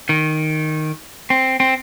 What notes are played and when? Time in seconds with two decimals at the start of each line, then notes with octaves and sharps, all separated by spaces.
0.09 D#3
1.30 C4
1.60 C4